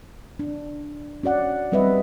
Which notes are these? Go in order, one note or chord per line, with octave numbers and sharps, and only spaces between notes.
D4
C#4 F#4 D5 F#5
G3 C4 B4 D#5 E5